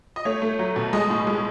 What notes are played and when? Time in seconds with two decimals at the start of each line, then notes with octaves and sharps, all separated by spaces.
0.16 D#5
0.25 A3 C#5
0.42 A3
0.59 F#3
0.76 B2
0.93 G#3 D#5
1.10 A2
1.27 G#3